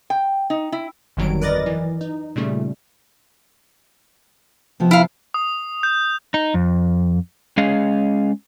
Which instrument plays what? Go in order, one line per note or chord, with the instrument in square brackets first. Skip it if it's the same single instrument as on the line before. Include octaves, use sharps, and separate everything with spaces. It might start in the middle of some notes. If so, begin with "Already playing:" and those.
[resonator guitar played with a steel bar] G5
D#4
E4
[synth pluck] G1 F2 D#3 F#3 G3 D7
A#4 B4 D5 D#5 A6 A#6
E3
D#4
A#2 C#3 G3 A3
[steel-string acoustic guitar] C3 F3 B3
[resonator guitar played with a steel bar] E4 F5
[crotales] D#6
G6
[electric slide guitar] D#4
F2
G#3 C#4 G#4 D#5 F5